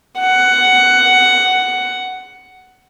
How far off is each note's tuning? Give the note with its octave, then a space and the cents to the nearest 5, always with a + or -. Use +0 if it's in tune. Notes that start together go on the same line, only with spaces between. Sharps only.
F#5 +10